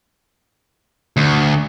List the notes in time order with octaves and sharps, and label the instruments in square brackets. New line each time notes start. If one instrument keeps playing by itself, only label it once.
[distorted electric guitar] D2